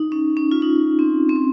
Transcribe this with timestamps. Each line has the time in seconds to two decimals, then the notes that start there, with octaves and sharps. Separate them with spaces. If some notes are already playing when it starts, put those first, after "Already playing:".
Already playing: D#4
0.12 C#4
0.37 C#4
0.51 F4
0.62 D#4
0.99 C4
1.29 C4
1.36 C#4